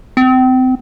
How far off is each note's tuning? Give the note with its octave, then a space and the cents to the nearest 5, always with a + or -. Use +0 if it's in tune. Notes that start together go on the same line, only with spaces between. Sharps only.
C4 -30